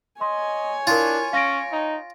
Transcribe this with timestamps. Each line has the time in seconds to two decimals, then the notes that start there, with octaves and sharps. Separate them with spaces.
0.21 C#5 D#5 G#5 C6
0.87 D4 E4 F4 A#4
1.33 C#4 F5 A#6 D7
1.72 D#4